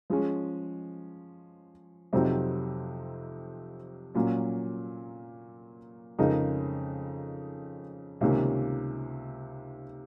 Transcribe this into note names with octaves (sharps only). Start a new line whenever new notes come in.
F3 G#3 C#4
F2 C3 F#3 C4 D#4
A#2 F#3 A#3 C#4
F2 C#3 G#3 D#4 A#4
C#2 C3 D#3 A#3 C#4